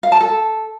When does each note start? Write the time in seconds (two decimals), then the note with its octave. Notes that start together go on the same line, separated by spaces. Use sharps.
0.03 F5
0.12 A5
0.21 A4